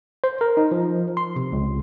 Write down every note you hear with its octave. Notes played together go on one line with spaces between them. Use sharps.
C5
A#4
D#4
F3
C6
C3
C#2